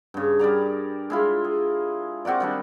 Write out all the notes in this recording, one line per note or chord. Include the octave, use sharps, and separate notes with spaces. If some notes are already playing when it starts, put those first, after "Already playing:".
G2 C#3
G3 A#4 D5 A#5
G#3 E4 F4
G#4
C4 F#4 A#4 D5
D#3 G3 D4